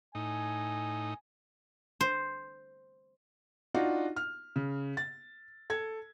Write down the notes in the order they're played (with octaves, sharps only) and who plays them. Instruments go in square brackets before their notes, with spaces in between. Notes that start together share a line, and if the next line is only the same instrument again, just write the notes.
[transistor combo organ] A2 D#4 [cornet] G#5
[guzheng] C5
[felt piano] D4 D#4 F4 F#4
F6
C#3
A6
A4 G#6